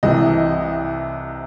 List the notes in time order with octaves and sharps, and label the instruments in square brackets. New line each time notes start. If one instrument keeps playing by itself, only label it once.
[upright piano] C2 C3 E3 D#5